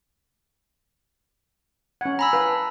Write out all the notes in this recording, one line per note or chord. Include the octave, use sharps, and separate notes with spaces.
C#4 F#5 G#6
G#5 A#5 B5 E6
B4 F5
A5